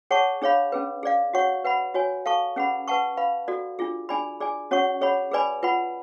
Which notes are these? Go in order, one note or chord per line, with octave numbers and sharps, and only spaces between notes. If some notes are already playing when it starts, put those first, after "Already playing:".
G#4 C#5 F#5 A5 C#6
D4 G#4 C#5 F5 B5
C#4 G#4 B4
G#4 D5 F5
F#4 C#5 F#5 C#6
B4 F#5 B5
F#4 C#5 G#5
A4 F5 A5 C#6
C#4 G#4 B4 F#5 B5
B4 F#5 A5 C#6
B4 F5 B5
F#4 A4 D5
D4 F4 G#4
D4 G#4 D5 G#5 B5
G#4 D5 G#5
C#4 F#4 C#5 F#5 C#6
G#4 C#5 F#5 B5
G#4 B4 D5 G#5 B5
F4 B4 F#5 B5